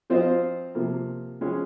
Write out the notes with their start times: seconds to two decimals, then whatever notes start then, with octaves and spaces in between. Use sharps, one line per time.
0.10 F3 C4 F4 C5 D#5
0.75 C3 F3 A#3
1.41 F3 G#3 C#4 G#4